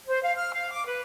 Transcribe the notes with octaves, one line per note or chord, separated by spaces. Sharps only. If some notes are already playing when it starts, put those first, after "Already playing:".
C5
F5
F6
F5
D6
B4